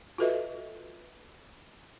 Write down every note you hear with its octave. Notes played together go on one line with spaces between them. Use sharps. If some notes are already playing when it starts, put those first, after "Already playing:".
F4 F#4 A4 B4 D#5 E5